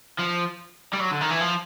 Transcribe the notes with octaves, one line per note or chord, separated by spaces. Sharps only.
F3
G3
F#3
D3
D#3
E3
F3